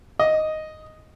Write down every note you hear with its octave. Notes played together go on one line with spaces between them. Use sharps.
D#5